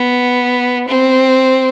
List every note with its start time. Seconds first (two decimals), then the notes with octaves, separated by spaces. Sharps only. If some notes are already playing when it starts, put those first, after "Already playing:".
Already playing: B3
0.88 C4